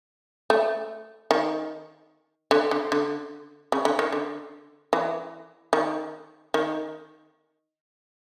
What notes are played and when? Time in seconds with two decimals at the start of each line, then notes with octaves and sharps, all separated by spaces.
0.50 A3
1.31 D#3
2.51 D3
2.71 D3
2.92 D3
3.72 C#3
3.85 D3
3.99 D#3
4.12 D3
4.93 E3
5.73 D#3
6.54 D#3